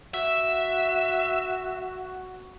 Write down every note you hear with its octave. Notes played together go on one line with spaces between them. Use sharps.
F#4 E5